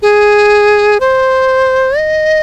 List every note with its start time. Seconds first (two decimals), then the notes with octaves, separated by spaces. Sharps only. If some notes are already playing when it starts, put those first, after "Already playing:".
0.02 G#4
1.00 C5
1.98 D#5